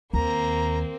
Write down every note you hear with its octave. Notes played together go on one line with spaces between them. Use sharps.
D#2 A#3 C4 A#5